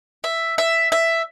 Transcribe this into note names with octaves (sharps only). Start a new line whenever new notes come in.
E5
E5
E5